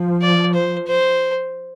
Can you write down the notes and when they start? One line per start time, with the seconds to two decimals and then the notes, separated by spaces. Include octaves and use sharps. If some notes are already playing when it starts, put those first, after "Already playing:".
Already playing: F3
0.22 D5
0.54 C5
0.87 C5